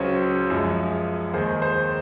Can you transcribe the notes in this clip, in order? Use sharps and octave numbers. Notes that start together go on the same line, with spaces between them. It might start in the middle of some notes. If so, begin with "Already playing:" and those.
Already playing: C#2 C#3 F#3 C5 C#5
F#2 F3 G#3
D#2 D#3 G#3 C5
C5